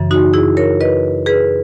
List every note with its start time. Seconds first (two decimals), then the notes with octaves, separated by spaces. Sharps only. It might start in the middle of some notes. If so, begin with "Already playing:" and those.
Already playing: F#2 C#3 E3
0.11 D#4 F#4
0.34 E4 G#4
0.57 A#4 C#5
0.81 B4 D#5
1.26 G#4 B4